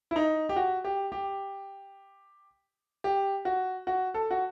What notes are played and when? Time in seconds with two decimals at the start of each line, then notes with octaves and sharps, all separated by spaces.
0.11 E4
0.16 D#4
0.49 G4
0.56 F#4
0.84 G4
1.12 G4
3.04 G4
3.45 F#4
3.87 F#4
4.14 A4
4.31 F#4